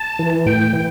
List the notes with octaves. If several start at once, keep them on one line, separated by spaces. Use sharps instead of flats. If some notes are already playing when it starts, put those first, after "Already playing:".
Already playing: A5
E3
A2 G5
E3